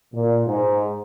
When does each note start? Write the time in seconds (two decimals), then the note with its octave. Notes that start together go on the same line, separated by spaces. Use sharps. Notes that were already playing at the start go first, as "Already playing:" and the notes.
0.13 A#2
0.47 G#2